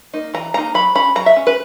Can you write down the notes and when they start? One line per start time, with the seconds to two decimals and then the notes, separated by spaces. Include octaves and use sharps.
0.14 A#3 D#4
0.34 E3 A#5
0.54 A#3 D#4 A#5
0.74 F#3 B5
0.95 C#4 B5
1.15 F#3 A#5
1.26 E5
1.36 C#4
1.47 B4